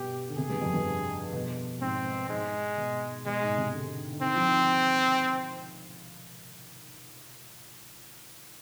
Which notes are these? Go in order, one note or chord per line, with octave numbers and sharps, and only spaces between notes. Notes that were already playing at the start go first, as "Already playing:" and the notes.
Already playing: G2 B2 G4
D3
C3 G#4
G2
F2
G2
B2
G#2 C4
G#2 G#3
B2
B2 G#3
G#2
C3
D3
D3
D#3 C4
F3
D#3